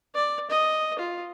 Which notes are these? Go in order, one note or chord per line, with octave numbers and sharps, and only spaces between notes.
D5
D#5
F4